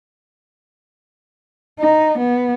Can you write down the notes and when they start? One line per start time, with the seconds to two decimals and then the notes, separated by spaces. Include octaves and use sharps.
1.79 D#4
2.18 B3